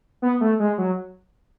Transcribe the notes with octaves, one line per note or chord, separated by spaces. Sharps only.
B3
A3
G#3
F#3